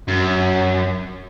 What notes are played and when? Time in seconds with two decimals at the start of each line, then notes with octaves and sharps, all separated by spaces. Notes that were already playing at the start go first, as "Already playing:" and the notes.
0.08 F#2